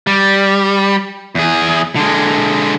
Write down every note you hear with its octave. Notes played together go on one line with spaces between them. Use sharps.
G3
E2 G#4
D3 G#3